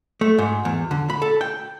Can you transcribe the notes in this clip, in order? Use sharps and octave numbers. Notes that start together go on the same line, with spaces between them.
A3
G#2
E2
D3
B5
A4
G5